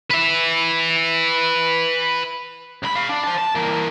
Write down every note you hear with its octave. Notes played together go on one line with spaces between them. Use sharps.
B4 E5
C#2 B5
F5 B5
D4
C5 A5
A5
E3 A#3